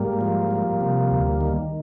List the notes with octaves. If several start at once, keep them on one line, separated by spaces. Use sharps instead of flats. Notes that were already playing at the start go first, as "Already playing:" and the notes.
Already playing: G#2 G3 A#3
F3
F3
C3
D2
D#3